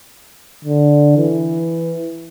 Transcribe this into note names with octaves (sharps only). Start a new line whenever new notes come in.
D3
E3